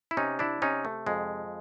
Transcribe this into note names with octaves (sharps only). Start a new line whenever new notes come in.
E4
C3 C#4 D#4
D4 E4
C3 C#4 D#4
A3
F2 G#3